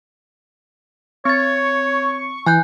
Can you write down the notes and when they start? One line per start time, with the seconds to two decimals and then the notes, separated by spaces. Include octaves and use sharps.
1.25 C4 C#5 C#6 A6
2.46 E3 G#5 F#6 G6